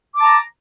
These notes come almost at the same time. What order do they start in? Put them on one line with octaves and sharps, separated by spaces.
D6 A5 A#5